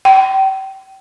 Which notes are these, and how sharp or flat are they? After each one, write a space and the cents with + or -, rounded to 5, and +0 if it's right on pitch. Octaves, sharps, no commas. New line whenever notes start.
G5 -35